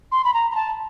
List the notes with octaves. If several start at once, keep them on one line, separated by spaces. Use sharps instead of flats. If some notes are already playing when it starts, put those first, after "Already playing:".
C6
B5
A#5
A#5
A5